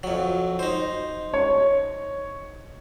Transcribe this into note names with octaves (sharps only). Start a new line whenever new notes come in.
F2 F#3
D#4 C5
C#5